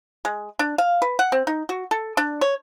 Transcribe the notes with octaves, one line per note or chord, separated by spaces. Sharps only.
G#3
D4
F5
B4
F#5
C4
D#4
F#4
A4
D4
C#5